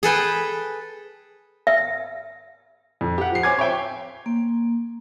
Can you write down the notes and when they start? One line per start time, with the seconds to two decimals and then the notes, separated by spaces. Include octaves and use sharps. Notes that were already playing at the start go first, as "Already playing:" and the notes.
0.03 G#4 A4 B4 G5
1.67 E5
3.01 F2
3.18 G4 F#5
3.32 F3 C7
3.43 C5 C#5 G#5 D6 G#6
3.57 C4 C#5 E5 G5
4.26 A#3